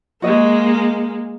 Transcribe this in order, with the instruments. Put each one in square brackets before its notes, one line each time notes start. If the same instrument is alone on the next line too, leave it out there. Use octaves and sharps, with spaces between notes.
[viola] G#3 A#3 [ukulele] F#4 D#5